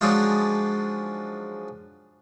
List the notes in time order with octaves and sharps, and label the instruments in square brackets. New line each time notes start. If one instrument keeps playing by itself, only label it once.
[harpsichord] F3 F#3 G#3 D4 D#4 F4